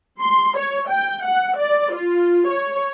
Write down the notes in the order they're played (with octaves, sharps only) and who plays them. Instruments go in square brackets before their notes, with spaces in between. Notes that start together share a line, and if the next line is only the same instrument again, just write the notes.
[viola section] C6
C#5
G5
F#5
D5
F4
C#5